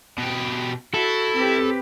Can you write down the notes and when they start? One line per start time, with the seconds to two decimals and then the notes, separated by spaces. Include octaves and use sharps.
0.18 B2 G4
0.94 E4 F#4 A4
1.37 C4 G4 B4